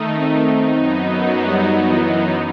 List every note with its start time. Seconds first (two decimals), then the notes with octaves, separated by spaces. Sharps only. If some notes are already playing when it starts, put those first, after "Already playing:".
Already playing: D#3 A3 D#4
0.17 C4
0.60 F#2 F#3 B3 D#4
1.48 G3
1.92 E3